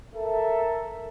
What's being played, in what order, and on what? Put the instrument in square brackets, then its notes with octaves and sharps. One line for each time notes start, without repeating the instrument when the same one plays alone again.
[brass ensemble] A4 A#4 E5